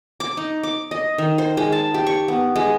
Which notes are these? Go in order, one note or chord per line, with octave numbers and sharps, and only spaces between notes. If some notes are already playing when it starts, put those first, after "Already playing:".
D6
D#4
D6
D#5
D#3
C5
G#3
A5
G4
C#6
B3
G#3